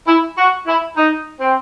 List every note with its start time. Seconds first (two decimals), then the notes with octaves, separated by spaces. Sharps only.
0.08 E4
0.38 F#4
0.67 E4
0.96 D#4
1.40 C4